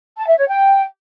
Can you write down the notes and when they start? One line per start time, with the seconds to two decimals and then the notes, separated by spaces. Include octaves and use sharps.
0.19 A5
0.28 E5
0.38 C#5
0.48 G5